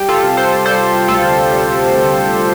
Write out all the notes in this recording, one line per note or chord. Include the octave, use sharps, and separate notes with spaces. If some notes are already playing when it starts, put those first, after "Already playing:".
Already playing: G3 G4
F4 A4
C3
A4 C5
G3 A4 C5
D2 F4 A4
G3
D2